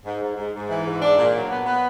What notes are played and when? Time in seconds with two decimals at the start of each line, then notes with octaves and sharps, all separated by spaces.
0.05 G#2
0.22 G#2
0.37 G#2
0.54 G#2
0.70 E3
0.86 G#2
1.02 D4
1.18 A#2
1.35 F#3
1.50 B3
1.66 B3